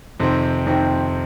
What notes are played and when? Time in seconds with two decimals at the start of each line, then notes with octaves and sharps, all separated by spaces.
0.20 F2 C3 D#3 C4
0.66 F2 C3 D#3 C4